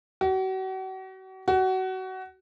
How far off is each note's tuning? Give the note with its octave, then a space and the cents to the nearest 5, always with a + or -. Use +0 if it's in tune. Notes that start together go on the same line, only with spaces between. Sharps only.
F#4 +40
F#4 +25